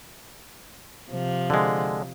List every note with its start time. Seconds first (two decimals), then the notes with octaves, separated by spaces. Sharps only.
1.09 C3 F3
1.50 D3 G#3